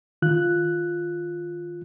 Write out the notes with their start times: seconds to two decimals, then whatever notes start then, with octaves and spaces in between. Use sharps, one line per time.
0.22 D#3 F4 F#6